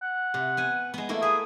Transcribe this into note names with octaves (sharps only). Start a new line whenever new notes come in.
F#5
C3
B3 G#5
G#3 B3
A3 A#3 E4
G#4 E5